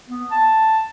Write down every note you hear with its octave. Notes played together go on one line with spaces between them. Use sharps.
B3
A5